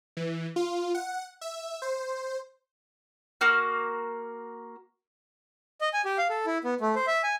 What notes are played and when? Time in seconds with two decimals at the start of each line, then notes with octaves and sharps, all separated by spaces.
0.17 E3
0.56 F4
0.95 F#5
1.41 E5
1.82 C5
3.41 A#3 F#4 F6
5.81 D#5
5.93 G#5
6.05 G4
6.18 F5
6.30 A4
6.46 E4
6.64 B3
6.81 A3
6.95 C5
7.07 E5
7.24 G#5